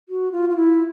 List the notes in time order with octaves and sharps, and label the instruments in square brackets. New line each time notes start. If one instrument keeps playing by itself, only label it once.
[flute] F#4
F4
F4
E4